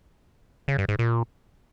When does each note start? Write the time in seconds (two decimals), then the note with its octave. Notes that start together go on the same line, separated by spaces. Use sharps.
0.68 C#3
0.78 G2
0.89 G#2
0.99 A#2